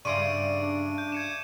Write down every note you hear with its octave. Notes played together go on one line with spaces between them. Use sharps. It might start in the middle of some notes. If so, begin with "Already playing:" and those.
G2 C#3 D5 E5 C6 C#6 D7 D#7
D4
G6
G#6 C#7 E7